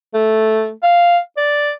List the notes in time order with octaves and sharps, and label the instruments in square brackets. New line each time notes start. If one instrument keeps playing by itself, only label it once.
[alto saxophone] A3
F5
D5